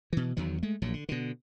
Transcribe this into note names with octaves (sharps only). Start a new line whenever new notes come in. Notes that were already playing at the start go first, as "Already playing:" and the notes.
B2 E3
E2 D#3 F#3
G#3 A3
A#1 A#2 F#3
D3
B2 D3